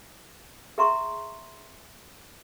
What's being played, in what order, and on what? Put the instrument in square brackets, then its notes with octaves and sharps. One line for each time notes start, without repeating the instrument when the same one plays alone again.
[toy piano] G#4 E5 A#5 C6 C#6